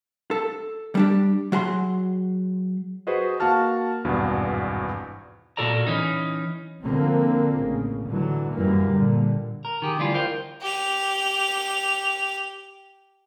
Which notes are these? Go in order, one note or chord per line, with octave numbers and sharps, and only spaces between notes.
A4
G3 D4 G4
F#3 F#4 G#4 G#5 C6
F#4 G#4 B4 C5 D#5
A#3 F#4 F5 A5 F6
G#1 E2 G2 B2
A#2 F3 F#4 A4 D5 A#5
E3 C#4 D#4
D3 F3 A#3 C4
A1 C#3
D3 E3 F#3
F#2 E3 G3 A#3
A#2 D3 G3
A#4
D#3 G4 G#4
D2 E3 G3 F4
A#4 C5 F5 G5
G4 F7